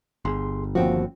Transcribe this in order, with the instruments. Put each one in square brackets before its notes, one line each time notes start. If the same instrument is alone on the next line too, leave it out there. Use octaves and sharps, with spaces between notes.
[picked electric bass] G1 [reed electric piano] G#4 C6
[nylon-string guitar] D#2 C4 F#4 [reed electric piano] F3